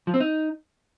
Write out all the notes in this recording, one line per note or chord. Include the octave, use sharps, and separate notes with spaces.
F3
C4
D#4